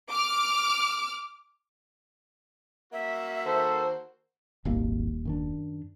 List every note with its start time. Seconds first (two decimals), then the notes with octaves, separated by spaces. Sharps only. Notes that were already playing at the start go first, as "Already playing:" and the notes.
0.10 D6 F6
2.93 A#3 F#4 E5
3.46 D#3 A4 C5
4.65 D#1 G#1 D#2 A#3
5.25 F#2 D#3 D4